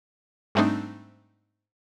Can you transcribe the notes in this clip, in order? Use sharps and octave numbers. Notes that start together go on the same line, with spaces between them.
G#2 G3 A3 C4 D4 D#4